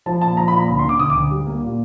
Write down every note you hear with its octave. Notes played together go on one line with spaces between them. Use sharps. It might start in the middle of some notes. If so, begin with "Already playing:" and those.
F3 A5
A#2 A5
F3 A#5
B5
A#2
A#5
D2 B5
C6
D3
D6
D2 D#6
D6
D2
G3
A#3
A#2